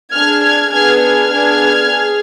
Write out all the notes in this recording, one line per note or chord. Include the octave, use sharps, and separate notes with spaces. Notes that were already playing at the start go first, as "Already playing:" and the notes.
D4 G#4 F6 G#6
F6 G#6
B3 D4 G#4 F6 G#6
F6 G#6
B3 D4 G#4
G#4